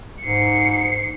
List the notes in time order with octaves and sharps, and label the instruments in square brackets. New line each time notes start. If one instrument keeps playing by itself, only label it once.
[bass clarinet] G#2 [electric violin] C7 C#7